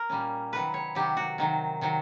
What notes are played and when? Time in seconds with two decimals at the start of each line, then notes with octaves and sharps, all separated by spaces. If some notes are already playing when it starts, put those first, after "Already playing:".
Already playing: A#4
0.09 A#2 G3 A#3 C#4
0.52 C3 D#3 F#3 B4
0.74 C#5
0.95 C3 D#3 F#3 G4
1.17 F#4
1.38 C3 D#3 F#3
1.81 C3 D#3 F#3